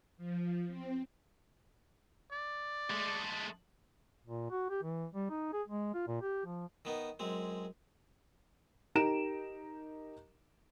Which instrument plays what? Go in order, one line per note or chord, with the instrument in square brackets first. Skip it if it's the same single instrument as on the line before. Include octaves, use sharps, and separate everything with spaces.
[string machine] F3
C4
[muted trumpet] D5
[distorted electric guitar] G#3 A3
[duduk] A#2
F#4
G4
E3
G3
D#4
G#4
G#3
F4
A#2
G4
F3
[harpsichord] D#3 B3 D#4
F#2 G#3 C4
[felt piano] D#4 G4 A#4 A#5 D7 E7